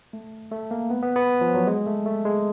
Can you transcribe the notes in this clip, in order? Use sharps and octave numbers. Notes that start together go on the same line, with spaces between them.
A3
A3
A#3
B3
B3
B3
F3
F#3
G#3
A3
A3
G#3